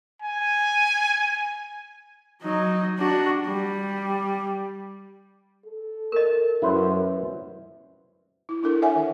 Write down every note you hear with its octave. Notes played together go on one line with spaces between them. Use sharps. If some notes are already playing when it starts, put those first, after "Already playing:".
G#5
F#3 D#4
D4 F#4
G3
A4
A#4 D#5
F#2 E4 B4 C5
E4
D4 E4 A4 A#4
C#5 E5 F#5 G#5
D#3